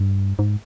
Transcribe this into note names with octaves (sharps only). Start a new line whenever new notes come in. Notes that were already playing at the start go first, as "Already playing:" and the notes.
Already playing: G2
G#2